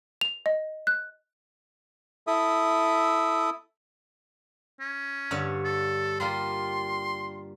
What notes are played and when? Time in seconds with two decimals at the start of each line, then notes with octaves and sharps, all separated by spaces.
0.21 F7
0.46 D#5
0.87 F#6
2.27 E4 A4 E5 D#6
4.80 C#4
5.31 G2 D3 C#5
5.65 A4
6.20 G3 A#3 F4 C6